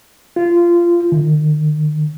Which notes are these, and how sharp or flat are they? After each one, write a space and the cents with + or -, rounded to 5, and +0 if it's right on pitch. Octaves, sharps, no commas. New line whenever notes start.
F4 -20
D#3 -40